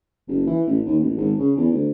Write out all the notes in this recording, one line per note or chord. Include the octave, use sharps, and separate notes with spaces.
F#1
E3
A1
D#2
A1
G#1
C#3
E2
D2